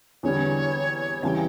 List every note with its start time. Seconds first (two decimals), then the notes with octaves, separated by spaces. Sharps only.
0.23 E2 D3 G3 C#5
1.23 E2 C#3 E3 G3 G5 A5